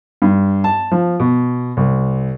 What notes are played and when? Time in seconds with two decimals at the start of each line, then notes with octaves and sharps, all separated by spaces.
0.22 G2
0.64 A5
0.92 F3
1.20 B2
1.77 C2